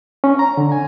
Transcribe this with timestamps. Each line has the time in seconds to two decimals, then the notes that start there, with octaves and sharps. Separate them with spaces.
0.24 C#4
0.39 A#5
0.57 D3
0.72 G#5